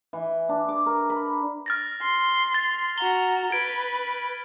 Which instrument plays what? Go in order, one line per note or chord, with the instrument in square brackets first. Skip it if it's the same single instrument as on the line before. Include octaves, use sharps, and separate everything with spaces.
[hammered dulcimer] E3
D4
D6
A#4
B5
[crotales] F6 A6 A#6
[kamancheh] C6
[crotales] A6
[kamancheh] F#4 A#5 [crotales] G7
[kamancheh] B4 [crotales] G#6 D7